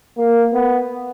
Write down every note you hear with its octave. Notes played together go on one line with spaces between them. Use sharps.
A#3
B3